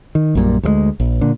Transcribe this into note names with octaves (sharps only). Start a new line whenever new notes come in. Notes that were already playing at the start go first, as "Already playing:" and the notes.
D#3
A#1 F#2 A#2 G3
D2 F3 G#3
A#1
A#2 D3